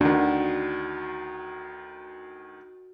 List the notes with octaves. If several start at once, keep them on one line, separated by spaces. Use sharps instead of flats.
D2 D#3 D4 F#4